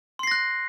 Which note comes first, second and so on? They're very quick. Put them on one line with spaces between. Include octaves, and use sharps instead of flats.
C6 C7 A#6 F#6